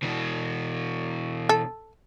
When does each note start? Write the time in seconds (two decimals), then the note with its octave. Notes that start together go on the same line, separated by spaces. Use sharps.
0.03 B2 E3
1.49 A4